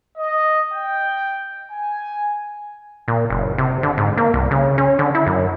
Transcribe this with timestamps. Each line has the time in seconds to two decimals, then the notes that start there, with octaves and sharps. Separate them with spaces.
0.17 D#5
0.72 G5
1.69 G#5
3.08 A#2
3.30 F#1
3.58 C3
3.83 D3
3.98 G#2
4.17 A#3
4.34 C2
4.51 C#3
4.78 C#4
4.99 D3
5.15 E4
5.27 F#2